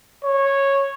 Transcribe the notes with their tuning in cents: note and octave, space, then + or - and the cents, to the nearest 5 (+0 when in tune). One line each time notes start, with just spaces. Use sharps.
C#5 -10